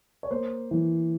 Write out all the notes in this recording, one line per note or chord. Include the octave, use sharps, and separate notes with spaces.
C#5
A#3 C5
E3